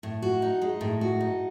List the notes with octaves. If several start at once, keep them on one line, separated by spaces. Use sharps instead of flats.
A2
F#4
D#4
G#3
A2
F#4
D#4